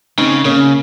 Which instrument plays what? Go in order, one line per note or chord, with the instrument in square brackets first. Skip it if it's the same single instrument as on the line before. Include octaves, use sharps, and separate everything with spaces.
[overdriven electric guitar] C#3 [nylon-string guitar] C4 D#4
[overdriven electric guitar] C#3 [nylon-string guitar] A#3 C#4